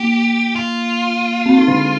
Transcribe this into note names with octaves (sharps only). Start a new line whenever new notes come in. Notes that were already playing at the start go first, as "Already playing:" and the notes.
Already playing: A#3 G4
F4
C4
D#4
D3 D4